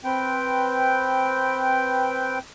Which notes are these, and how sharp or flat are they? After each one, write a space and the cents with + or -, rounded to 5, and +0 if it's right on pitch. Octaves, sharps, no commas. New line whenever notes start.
C4 +0 B4 +0 G5 -5